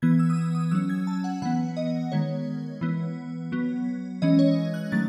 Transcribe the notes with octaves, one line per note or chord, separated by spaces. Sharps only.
E3 B3 G#6
E6
D#6
E6
D#6
F#3 C#4 E6
G#6
A5
F#5
E3 B3 F#5
D#5
D#3 G#3 B3 C#5
E3 B3
F#3 B3
E3 G#3 C#4 D#5
C#5
F#6
D#3 F#3 A3 A6